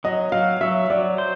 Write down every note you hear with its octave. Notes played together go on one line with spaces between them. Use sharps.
F#3 D#5
F#3 F5
F#3 E5
F#3 D5
C5